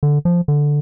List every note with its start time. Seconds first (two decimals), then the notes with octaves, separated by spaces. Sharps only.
0.03 D3
0.25 F3
0.48 D3